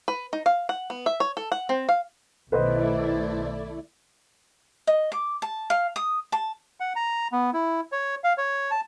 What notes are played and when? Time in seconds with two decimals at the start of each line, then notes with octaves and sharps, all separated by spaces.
0.08 B4
0.33 D#4
0.46 F5
0.69 F#5
0.90 B3
1.06 E5
1.20 C#5
1.37 A4
1.52 F#5
1.69 C4
1.89 F5
2.52 B1 D#3 A3 E4 B4 C5 D5 D#5
4.87 D#5
5.12 D6
5.42 A5
5.70 F5
5.96 D#6
6.32 A5
6.80 F#5
6.96 A#5
7.32 B3
7.53 E4
7.92 C#5
8.24 F5
8.38 C#5
8.71 A5